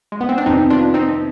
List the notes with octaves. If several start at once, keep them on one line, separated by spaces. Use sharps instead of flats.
G#3
B3
C4
D4
F2 C3 D#3 B3 C4 D#4
D4 F4
C4 D#4